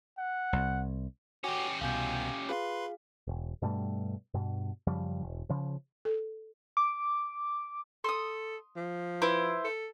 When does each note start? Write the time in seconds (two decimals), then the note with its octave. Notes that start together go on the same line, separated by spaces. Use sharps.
0.18 F#5
0.53 C2
1.44 C#4 F#4 G4 G5 D6
1.81 C2 B2 F5 G#5 G6
2.49 F4 G#4 B4 F5 C6
3.27 E1
3.62 G2 B2 G3 A3
4.34 G2 B2
4.87 F#2 C#3 F3 G3
5.23 E1
5.49 C#3 F3
6.05 A4
6.77 D6
8.04 A4 C6 D#6
8.76 F3
9.22 E4 B4 C5
9.65 A4